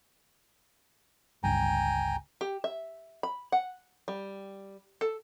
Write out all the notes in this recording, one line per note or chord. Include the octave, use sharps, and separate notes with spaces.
G1 C#2 G2 G5 G#5 A#5
G4
E5
B5
F#5
G3
A4